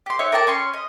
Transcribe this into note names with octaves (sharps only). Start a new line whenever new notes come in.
G4 C6
D#4 C#5 E5 F#5
A#4 D5 G5 A5
C#4 G#5 C6 C#6
D#5